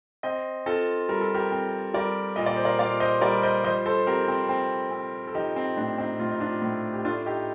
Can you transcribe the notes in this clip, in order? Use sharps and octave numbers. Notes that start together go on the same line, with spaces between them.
C4 C5 D#5
C4 F4 A4
G3 A#4
A4
G4 A#4
C4
G3 A#4 D5
A#2 D#5
D5
C5
A#4 D5
A#2 D5 F5
C5 D#5
G3 A#4 D5
C5 D#5
F3 C5 D#5
A4 C5
C4 G4 A#4
C4
C4
C4
A4
F3 D#4 G4
C4
A2 D4
C4 D#4
A2 F4
D#4
D4 F4
A2
G4
A3 D4 F4
D#4 G4